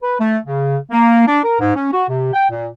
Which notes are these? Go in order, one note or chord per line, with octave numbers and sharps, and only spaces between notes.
B4
A3
C#3
A#3
D4
A#4
G#2
C#4
F#4
C3
G5
A#2